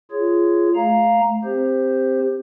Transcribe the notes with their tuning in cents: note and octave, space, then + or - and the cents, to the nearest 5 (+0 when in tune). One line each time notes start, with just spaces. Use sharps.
F4 -20 G#4 +0 C#5 +0
A3 -30 F5 +0 A#5 +0
C4 +0 G4 +15 C5 +0